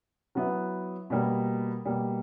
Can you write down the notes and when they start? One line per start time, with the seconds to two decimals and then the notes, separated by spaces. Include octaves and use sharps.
0.35 F#3 B3 E4
1.10 B2 G3 A#3
1.85 B2 G3 A#3